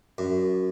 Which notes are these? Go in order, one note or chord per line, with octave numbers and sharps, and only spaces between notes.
F#2